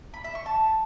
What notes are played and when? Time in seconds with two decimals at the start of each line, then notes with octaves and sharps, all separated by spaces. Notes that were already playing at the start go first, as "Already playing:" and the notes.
0.14 B5
0.24 E5
0.35 C#6
0.46 A5